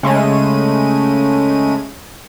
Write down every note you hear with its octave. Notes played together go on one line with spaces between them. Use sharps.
C#3 G#3 A3 D#7